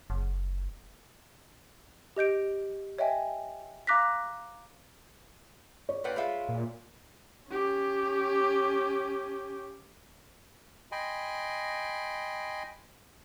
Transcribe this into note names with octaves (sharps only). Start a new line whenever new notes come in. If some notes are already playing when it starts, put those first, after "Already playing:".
F#1
G4 D#5 G6 D7
C#5 D#5 E5 G5 G#5
F5 A#5 D6 F#6 A#6 B6
C#5 D5
A#2 B4 C5 F#5 G5
G#3 F4 E5 B5
A#2
C#4 G4
D#5 G5 G#5 B5 C6